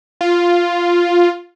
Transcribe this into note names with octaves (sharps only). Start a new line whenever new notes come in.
F4